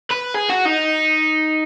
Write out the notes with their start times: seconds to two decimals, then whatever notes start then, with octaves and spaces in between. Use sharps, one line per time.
0.11 B4
0.35 G#4
0.50 F#4
0.66 D#4